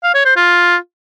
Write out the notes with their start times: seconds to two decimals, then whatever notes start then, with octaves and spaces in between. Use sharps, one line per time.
0.04 F5
0.15 C#5
0.25 C5
0.36 F4